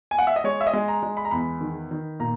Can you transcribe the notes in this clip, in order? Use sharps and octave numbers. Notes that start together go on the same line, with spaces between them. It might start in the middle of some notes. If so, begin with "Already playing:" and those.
G#5
F#5
E5
D#5
G#3 C#5
E5
D#5
G#3
A#5
G#3
B5
A#5
E2 B5
D#3
D#3
A#2 A#5